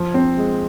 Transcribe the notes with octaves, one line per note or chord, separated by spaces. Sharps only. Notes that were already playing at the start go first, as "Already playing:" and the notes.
Already playing: F3
C4
G#3